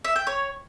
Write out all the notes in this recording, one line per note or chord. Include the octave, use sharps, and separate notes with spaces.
E5
G5
C#5